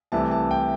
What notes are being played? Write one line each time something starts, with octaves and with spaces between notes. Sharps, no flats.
C2 C3 E3 A3 A5
A5
G5